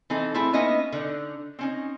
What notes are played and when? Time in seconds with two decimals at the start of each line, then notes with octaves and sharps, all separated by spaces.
0.10 E3 C4 D#4 A4
0.35 A3 C4 E4 G#4
0.53 A#3 B3 C#4 D#4 D#5 E5
0.92 D3 D#4
1.59 C4 C#4 D#4